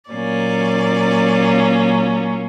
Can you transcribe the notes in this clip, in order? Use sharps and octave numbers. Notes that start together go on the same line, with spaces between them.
A#2 F#3 A#3 C#4 D5